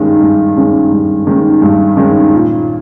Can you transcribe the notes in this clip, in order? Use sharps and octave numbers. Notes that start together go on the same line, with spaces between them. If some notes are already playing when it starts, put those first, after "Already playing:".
Already playing: G2 D#3 G#3 C#4
G2
D#3 G#3 C#4
G2
D#3 G#3 C#4
G2
D#3 G#3 C#4
A#2